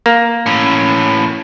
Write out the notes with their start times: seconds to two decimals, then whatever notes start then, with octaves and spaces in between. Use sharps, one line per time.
0.06 A#3
0.46 A2 C#4